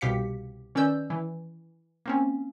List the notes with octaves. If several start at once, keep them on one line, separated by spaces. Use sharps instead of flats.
C2 B2 G4 F5 B6 C#7
D#3 C#4 B4 D5 E6 G6
E3
A#3 C4 C#4